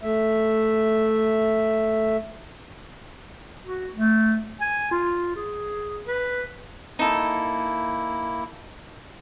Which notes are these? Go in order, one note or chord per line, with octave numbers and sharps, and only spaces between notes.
A3 E5
F#4
A3
G#5
F4
G#4
B4
A#3 D#4 E4 A4